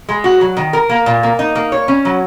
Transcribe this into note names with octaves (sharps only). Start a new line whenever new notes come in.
G#3
F#4
F#3
D#3
A#4
A#3
A#2
A#3
D#4
A#3
C#5
C#4
F#3